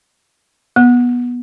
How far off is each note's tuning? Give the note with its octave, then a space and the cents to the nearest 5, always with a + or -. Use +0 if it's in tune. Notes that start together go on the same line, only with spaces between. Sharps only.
B3 -15